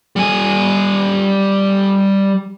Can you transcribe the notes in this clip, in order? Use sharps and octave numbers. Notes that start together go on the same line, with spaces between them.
G3 G#5